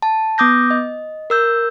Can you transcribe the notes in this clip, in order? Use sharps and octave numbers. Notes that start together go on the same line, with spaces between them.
A5
B3 D6 D#6 G6 A#6
D#5
A#4 E6 G6